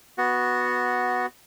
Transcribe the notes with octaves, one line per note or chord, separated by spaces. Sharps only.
B3 F#4